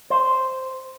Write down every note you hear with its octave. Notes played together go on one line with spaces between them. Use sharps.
C5